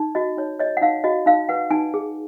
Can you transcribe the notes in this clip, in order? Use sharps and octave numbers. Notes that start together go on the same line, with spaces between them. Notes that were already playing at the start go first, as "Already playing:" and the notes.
Already playing: D#4
F#4 D#5
D#4 C#5
C#5 D#5
F#5
D#4 F5
F#4 D#5
D#4 F5
B4 F#5
D#4 G#5
G#4